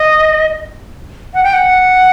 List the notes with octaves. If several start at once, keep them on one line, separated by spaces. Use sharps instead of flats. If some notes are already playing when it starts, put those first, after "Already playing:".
Already playing: D#5
F#5
G5
F#5